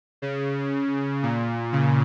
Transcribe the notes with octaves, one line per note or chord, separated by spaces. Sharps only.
C#3
A#2
C#3